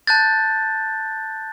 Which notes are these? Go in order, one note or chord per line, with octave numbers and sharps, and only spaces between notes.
A5 F#6 G6 A6